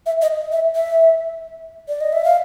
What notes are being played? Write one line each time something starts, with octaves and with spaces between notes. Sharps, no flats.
E5
D#5
E5
E5
D5
D#5
E5
F5